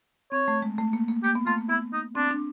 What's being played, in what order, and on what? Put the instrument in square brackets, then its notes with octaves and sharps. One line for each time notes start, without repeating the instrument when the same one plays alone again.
[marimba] C4 [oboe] C#5
[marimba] A3
G#3
A3
A#3
A#3
[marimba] A#3 [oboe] G4
[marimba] B3
[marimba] A3 [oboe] F4
[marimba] A#3
[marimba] B3 [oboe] E4
[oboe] D#4
[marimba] C4 [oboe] D4
[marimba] D4